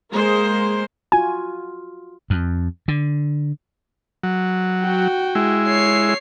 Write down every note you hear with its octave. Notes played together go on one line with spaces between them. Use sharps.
G#3 A#3 C5
F4 F#4 G#5
F2
D3
F#3
F#4 G5
G#3 E4
C#5 C7